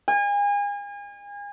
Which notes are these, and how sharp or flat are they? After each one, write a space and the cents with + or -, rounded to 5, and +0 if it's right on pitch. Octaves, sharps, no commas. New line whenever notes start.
G#5 -35